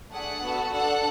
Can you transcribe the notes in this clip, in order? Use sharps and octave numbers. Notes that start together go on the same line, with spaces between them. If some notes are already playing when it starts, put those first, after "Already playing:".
A3 D4 G#4 F#5
B3 F#4 A4
D4 A4 F#5